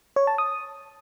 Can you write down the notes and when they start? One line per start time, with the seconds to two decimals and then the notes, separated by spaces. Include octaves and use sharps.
0.16 C#5
0.27 A5
0.38 D#6